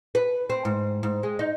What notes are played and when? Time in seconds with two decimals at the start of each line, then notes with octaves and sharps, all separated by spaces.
0.15 B4
0.50 C4
0.65 G#2
1.03 G#2
1.23 G#3
1.39 D#4